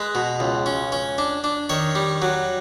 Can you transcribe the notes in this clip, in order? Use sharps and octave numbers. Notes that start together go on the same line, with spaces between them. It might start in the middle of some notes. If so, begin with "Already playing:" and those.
Already playing: G#3 B4
B2
C#2
C#4
C#4
D4
D4
D#3 C#5
G3
F#3